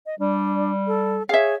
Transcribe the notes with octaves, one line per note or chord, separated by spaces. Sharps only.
D#5
G3 D4
A4
G#4 C#5 E5 F5